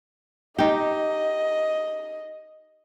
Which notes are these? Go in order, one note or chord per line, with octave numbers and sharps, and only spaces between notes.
D#4 G4 D#5